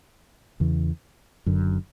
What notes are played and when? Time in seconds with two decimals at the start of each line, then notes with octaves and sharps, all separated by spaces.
0.60 E2 C#3 E3
1.46 F#1 F#2 D3